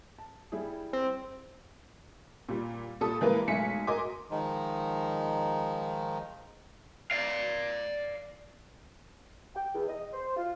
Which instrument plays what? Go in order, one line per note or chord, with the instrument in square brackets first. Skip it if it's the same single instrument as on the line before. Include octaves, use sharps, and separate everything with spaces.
[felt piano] A5
G3 E4 G#4
[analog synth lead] C4
[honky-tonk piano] A#2 G3
A#2 G3 A4 A5 D#6
E3 G3 G#3 A#3 A#4 B4
B1 G#3 A3 G#5 B6 C#7
F#4 A#4 D#5 G#5 C6 D6
[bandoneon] D#3 F3 G#3 D#4
[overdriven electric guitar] D5 F5
[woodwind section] G5
E2
D#5
C5
F4